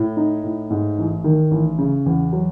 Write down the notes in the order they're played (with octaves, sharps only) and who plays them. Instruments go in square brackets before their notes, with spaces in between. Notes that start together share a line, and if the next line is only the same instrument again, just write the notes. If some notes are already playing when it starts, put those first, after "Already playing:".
Already playing: [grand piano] A2
D#4
A2
G#2
A1
D#3
A1
C#3
E2
F#3